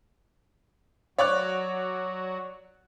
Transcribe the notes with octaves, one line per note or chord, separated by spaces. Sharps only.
F#3 F#4 C#5 D5 F#6